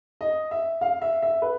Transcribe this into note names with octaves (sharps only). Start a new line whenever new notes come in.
D#5
E5
F5
E5
E5
B4